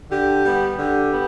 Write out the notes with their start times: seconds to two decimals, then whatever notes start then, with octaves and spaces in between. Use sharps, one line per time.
0.11 D3 G4
0.45 G3 B3
0.79 D3 G4
1.12 B3